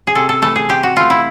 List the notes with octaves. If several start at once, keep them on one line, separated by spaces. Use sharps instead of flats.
G#4
C3 A4
A4
E3 A3 A4
G#4
C3 G4
F#4
E3 A3 F4
E4